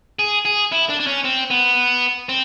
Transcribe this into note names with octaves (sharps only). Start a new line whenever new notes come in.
G#4
G#4
E4
D4
D4
C#4
C4
B3
C4